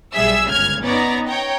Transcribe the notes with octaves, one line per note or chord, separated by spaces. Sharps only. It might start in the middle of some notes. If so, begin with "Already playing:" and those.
B1 G3 G#4 E5 E6
G1 C#2 C#3 F6 G#6
B3 C#4 D#4 C#5 D5 A#5
C#5 G5 A#5